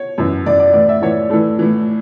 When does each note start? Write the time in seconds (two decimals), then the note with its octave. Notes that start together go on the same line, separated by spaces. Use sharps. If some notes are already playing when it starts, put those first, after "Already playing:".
Already playing: C#5
0.18 F#2 E3
0.46 F#2 E3 D5
0.60 D5
0.73 A2 E3 D5
0.89 E5
1.02 A2 E3 C#5
1.30 A2 E3 A4
1.59 A2 E3